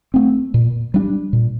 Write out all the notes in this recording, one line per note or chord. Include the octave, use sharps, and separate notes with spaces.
A3 C4
A#2
G3 D4
A#2